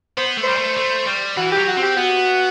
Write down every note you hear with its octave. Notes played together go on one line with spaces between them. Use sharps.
B3 C5
A3
C5
G3
A3
A3
G3
E3 F#4
G4
F#3
F#4
C4
G4
B3 F#4